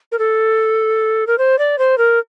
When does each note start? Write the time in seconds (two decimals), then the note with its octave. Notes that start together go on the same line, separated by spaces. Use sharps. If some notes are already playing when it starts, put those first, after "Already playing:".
0.12 A#4
0.19 A4
1.27 A#4
1.38 C5
1.58 D5
1.78 C5
1.98 A#4